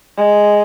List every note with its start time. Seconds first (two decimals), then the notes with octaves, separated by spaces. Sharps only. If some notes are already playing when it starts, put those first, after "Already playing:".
0.17 G#3